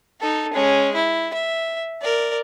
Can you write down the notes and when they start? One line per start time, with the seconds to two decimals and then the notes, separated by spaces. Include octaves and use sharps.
0.20 D#4 A4
0.53 G#3 C#4
0.95 E4
1.33 E5
2.01 A#4 D5